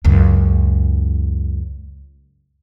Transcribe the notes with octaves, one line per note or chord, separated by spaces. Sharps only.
C#2 F#2